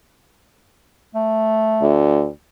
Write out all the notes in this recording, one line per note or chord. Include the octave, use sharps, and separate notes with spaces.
A3
D2